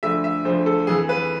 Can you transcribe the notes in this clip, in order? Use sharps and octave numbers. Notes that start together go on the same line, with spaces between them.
D2 D3 F3 E5
E5
D2 D3 F3 C5
A4
F2 E3 G#4
B4